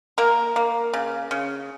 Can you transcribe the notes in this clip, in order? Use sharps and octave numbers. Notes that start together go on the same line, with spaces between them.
A#3 A#4
A#3
C#3
C#3